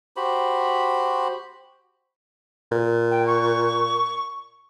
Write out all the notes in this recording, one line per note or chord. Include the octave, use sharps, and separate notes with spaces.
F#4 G4 C5 B5
A#2
G5
C#6